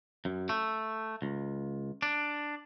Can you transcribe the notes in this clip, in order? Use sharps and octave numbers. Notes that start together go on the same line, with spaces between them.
F#2
A3
C#2
D4